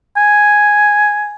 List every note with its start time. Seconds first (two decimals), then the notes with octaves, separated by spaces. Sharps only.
0.17 G#5